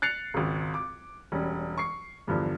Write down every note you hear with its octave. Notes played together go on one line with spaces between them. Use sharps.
F#6 A6 C7 C#7 F7
G#1 C#2
D6
E1 G3 C#4
C#6 C7
E2 G2 D3 F3